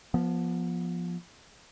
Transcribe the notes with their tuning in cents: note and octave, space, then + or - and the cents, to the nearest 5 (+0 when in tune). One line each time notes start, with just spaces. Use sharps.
F3 +0 B3 -30